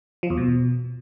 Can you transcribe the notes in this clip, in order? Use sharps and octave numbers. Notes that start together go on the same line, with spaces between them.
F3
E2
B2